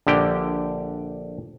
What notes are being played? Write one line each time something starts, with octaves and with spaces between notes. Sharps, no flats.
A#1 D3 G4 G5